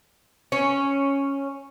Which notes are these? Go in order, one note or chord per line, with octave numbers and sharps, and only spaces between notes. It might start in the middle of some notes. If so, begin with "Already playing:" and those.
C#4